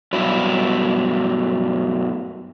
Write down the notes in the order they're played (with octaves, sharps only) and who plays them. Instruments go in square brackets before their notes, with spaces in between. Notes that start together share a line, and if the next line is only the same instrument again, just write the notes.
[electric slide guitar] G2 B2 E4 [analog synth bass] F#3